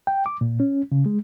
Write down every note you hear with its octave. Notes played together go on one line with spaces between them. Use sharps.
G5
D6
A#2
C#4
C#3
G#3